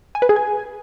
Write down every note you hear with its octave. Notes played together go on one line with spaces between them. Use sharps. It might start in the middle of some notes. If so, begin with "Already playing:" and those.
G#5
B4
G#4
G#5